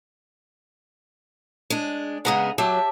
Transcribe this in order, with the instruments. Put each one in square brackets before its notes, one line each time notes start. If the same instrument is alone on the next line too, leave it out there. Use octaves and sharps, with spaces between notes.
[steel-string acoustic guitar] G#3 D4
[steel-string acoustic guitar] C#3 G#3 B3 [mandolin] F#5 A#5 D#6
[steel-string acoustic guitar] F#3 [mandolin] G4 E5 A5